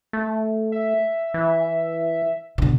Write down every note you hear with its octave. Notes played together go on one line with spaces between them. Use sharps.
A3
E5
E3
B2 D3